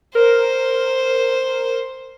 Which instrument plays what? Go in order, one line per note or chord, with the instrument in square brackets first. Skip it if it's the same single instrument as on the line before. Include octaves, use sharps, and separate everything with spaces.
[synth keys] A#4 [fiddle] C5